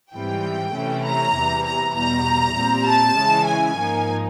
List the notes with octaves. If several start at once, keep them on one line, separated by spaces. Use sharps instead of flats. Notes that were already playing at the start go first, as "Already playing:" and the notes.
G#2 E3 G3 C4 G5
C3 E3 A3 C#4 E4
A#5
E2 C3 E3 G3
A#5
E2 B2 G3 A#5
A#2 G3 C4
A5
C#3 E3 G#3 C#4 E4
G#5
G#2 F3 A#3 D#4